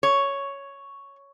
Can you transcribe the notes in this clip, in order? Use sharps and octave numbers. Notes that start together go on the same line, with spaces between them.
C#5